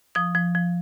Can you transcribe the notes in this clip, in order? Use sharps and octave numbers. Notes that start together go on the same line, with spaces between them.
F3 D#6
F3
F3